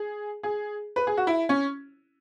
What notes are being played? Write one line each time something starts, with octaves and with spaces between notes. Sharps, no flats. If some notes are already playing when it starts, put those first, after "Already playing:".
Already playing: G#4
G#4
B4
G#4
F#4
E4
C#4